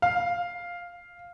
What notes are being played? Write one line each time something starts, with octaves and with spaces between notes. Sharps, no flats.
F5